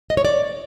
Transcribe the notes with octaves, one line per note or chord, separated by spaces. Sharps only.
D#5
C#5
D5